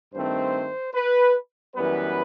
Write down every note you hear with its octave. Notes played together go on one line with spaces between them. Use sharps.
G2 D#3 A3 C4 C5
B4
F#2 E3 G3 B3 B4